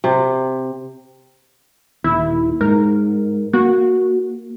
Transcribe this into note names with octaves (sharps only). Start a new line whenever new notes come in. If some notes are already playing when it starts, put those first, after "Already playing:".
C3
D#1 D#2 E4
G#2 A#4
A#3 F#4